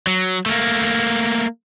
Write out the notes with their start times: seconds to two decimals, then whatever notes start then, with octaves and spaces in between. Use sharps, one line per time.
0.07 F#3
0.46 A3 A#3